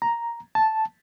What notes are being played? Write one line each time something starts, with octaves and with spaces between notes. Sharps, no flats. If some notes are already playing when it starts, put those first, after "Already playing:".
A#5
A5